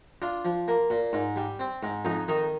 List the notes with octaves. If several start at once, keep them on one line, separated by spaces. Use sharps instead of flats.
D4 F4
F3
A#3
A#2
G#2
G3
C4
G#2
F2 D#4
D#3 D#4